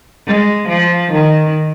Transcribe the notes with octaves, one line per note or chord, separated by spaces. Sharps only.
G#3
F3
D#3